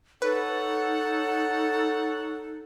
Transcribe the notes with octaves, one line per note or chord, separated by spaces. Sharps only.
D#4 A4 B4 C#5 F#5